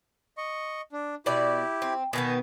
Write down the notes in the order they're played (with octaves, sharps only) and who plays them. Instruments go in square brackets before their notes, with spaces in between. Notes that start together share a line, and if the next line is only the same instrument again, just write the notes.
[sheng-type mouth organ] D#5 C#6
D4
[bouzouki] B2 D5 [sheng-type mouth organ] E4 G4
[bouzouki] C4
[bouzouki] B2 D#3 B3 [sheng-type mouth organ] G#5